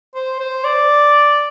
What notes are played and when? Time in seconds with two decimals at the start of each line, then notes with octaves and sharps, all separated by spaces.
0.15 C5
0.40 C5
0.64 D5